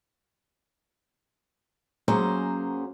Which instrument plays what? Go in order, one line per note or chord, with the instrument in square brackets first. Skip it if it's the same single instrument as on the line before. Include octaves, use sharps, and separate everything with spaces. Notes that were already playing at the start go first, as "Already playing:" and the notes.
[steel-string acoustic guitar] F#2 F#3 A#3 C#4 G#4 C5